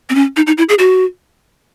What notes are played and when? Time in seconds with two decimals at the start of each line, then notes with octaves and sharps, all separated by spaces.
0.10 C4
0.15 C#4
0.37 D#4
0.47 D#4
0.58 E4
0.69 G#4
0.79 F#4